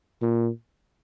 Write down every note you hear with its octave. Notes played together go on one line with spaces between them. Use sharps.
A#2